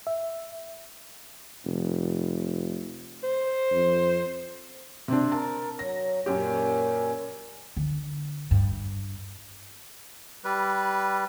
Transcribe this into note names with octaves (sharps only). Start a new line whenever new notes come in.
E5
F1
C5
F2
C3 C4 D4
A#4 A5
F#3 A#6
F#2 A#2 C#4 G4
D3
G2
G3 B4